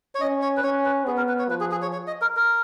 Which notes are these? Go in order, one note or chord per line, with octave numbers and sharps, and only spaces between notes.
C#5
C#4 D#5
C#5
B4
C#4 C#5
B4
B3 G#4
A#4
B4
C#5
F3 B4
G#4
G#4
C#5
C#5
D#5
A#4
A#4